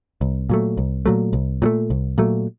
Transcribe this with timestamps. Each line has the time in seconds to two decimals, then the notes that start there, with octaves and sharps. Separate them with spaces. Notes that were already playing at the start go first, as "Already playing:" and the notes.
0.21 C2
0.50 A#2 F#3 A3
0.77 C2
1.06 A#2 F#3 A3
1.33 C2
1.62 A#2 F#3 A3
1.90 C2
2.18 A#2 F#3 A3